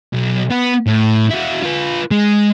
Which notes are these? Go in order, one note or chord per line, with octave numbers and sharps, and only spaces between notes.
B1
B3
A2
E4 F#4
F4 B4
G#3